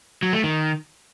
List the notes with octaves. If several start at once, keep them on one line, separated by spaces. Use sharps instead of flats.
F#3
A3
D#3